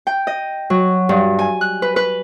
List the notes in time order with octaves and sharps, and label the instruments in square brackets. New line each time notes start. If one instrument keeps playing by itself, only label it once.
[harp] G5
D#5
F#3
G2
G#5
F#6
B4
B4